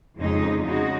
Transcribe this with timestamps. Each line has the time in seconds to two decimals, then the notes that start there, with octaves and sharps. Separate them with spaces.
0.17 F2 C#3 G#3 D#4
0.63 C#3 G#3 D#4 F#4